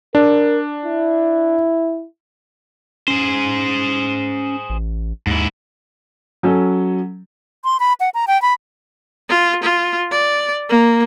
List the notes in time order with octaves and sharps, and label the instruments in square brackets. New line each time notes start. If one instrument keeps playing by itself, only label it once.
[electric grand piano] D4 [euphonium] A#4
[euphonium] E4
[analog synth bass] C#4 [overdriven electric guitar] G#4 C5
[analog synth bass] A1
[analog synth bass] D#2 [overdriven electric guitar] G#2 E4
[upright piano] F#3 C#4 A4
[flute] C6
B5
F#5
A#5
G5
B5
[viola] F4
F4
D5
A#3